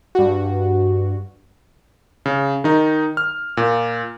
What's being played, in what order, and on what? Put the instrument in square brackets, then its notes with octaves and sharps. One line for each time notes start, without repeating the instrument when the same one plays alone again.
[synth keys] G2 F#4
[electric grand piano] C#3
D#3 D#4
F6
A#2